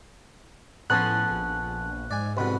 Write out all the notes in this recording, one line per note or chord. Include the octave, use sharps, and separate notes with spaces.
A2 F3 B3 C#4 G#4 A4 F#6
A#1
G#2 D5 G#5
C2 B2 D3 B4